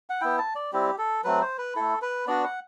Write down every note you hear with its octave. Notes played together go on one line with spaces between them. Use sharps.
F#5
B3 E4 G5
A5
D5
G3 C4 E4 G4
A4
F#3 A3 C4 B4
C5
B4
A3 E4 A4
B4
B3 D4 F#4 D5
F#5